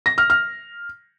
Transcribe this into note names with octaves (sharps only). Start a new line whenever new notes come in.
A#6
F6
F6